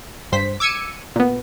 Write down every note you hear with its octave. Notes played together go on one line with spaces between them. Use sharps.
G2 C5 B6
D6 E6 G#6 C#7 D#7
A#2 B3